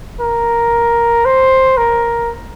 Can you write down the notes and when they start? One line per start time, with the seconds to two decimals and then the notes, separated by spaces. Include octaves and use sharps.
0.21 A#4
1.25 C5
1.78 A#4